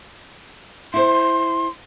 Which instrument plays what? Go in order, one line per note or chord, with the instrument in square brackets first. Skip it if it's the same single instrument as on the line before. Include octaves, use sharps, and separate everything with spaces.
[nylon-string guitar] E4 C5 [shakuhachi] C6